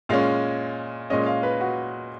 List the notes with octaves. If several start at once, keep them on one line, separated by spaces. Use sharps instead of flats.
A#2 G#3 C#4 F5
A#2 G#3 C#4 D#5
F5
B4
F#4